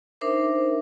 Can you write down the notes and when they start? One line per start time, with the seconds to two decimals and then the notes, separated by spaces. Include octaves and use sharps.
0.21 D4 D#4 A#4 C5 E5 D6